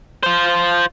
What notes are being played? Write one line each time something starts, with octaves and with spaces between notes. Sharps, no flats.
F4 C5